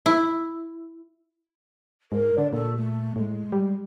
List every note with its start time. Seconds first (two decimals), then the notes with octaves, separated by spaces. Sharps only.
0.06 E4
2.12 G#2 A#4
2.38 D3 D5
2.53 A#2 A4
2.77 A3
3.16 A2 G#3
3.52 G3